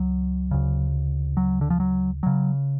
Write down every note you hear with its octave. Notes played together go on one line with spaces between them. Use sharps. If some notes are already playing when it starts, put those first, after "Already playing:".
Already playing: C#2 F#3
D2 C#3
F#3
D3
F3
F#3
C#3 F#3